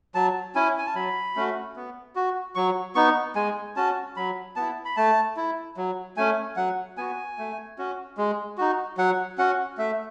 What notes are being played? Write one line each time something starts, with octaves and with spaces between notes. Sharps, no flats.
F#3 A5
C#4 E4 G#5
G#5
A5
F#3 B5
A3 C#4 F#4
B3
F#4
F#3 C#6
B3 D#4 C#6
G#3 G#5
C#4 F#4 A5
F#3 B5
B3 E4 A5
B5
A3 A5
E4
F#3
A3 C#4 G#5
F#3 F#5
B3 F#4 G#5
A3
C#4 F#4
G#3
D#4 F#4
F#3 F#5
C#4 F#4 F#5
A3 E5